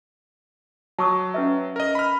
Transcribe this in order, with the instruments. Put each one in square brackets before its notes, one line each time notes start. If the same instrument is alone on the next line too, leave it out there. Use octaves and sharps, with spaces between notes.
[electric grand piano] F#3 [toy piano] A5 C#6 D#6
[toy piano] C#4 B4 E5
[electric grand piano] A#4 D#5
B5 F6